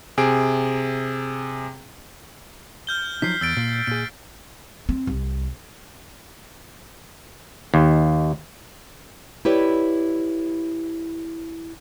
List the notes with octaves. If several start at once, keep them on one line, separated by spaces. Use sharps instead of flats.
C3 G#4 D7
F6 G6 G7
F3 F#3 D#4 B6 C7
E2 E6 A6 D7
A#2
A#2 G#4 D7
C4
C2
D#2
E4 G4 B4 C#5 D5